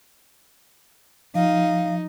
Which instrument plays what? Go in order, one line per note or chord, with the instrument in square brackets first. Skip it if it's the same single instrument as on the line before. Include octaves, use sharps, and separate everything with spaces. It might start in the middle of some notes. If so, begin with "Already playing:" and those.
[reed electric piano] F3 [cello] D#4 [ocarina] F5